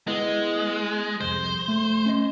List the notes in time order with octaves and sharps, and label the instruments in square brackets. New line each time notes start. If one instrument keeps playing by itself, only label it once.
[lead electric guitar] G#3 [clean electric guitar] B3 E4 D#5
[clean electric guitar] C2 F2 [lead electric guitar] C5
[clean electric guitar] A3
C#4 D#5